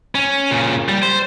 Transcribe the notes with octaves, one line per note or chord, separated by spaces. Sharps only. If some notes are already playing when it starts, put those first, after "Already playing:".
C#4
A#2 C#3
G3
C5